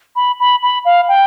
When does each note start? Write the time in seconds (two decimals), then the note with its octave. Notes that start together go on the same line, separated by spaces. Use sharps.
0.16 B5
0.40 B5
0.63 B5
0.85 F5
1.08 G5